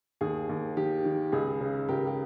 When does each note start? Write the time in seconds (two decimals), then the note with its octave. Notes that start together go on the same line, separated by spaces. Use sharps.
0.21 D#2 G#4
0.49 D#2
0.77 D#3 G4
1.05 D#3
1.32 C#2 G#4
1.61 C#3
1.88 C#2 G4 A#4
2.07 G4